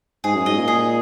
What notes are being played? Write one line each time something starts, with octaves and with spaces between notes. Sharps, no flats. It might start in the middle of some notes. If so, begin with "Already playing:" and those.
G#2 G#4
F#2
G#2 D#5
A#2
G#4